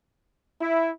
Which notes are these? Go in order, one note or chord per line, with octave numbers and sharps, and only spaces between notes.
E4